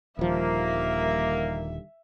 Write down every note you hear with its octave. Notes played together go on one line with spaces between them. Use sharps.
D#1 D3 D#3 F3 G3 A#3 E5